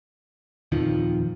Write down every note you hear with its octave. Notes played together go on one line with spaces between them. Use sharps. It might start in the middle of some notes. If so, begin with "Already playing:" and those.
D#1 F2 D#3 F3